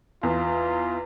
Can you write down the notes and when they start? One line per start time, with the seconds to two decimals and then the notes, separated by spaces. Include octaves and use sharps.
0.23 E2 F4